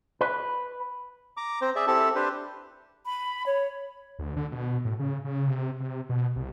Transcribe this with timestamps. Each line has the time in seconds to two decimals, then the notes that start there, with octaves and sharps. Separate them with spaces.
0.21 B4
1.37 A#5 D6
1.62 C4 C5 A#5
1.76 G#4 D5 E5
1.87 C4 E4 G4 A4 A5
2.15 D4 G4 B4 C5
3.06 B5
3.46 C#5
4.19 D2
4.37 D3
4.52 B2
4.85 A2
4.99 C#3
5.25 C#3
5.48 C3
5.80 C3
6.09 B2
6.36 C2